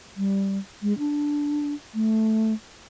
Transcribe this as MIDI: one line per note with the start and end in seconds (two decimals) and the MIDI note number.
0.17 0.58 55
0.82 0.97 56
0.98 1.74 62
1.95 2.54 57